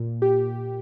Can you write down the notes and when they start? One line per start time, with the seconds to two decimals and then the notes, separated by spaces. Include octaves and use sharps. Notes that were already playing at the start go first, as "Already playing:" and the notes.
Already playing: A#2
0.22 G4